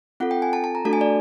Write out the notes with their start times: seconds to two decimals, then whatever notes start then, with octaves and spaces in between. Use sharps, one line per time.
0.20 C4 F4 A4 F#5
0.31 G5
0.42 G#5
0.53 A5
0.64 A5
0.75 A#5
0.85 A3 D4 F#4 A4 A5
0.93 G#5
1.01 D5